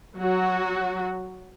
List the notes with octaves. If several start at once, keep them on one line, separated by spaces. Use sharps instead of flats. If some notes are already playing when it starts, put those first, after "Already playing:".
F#3 F#4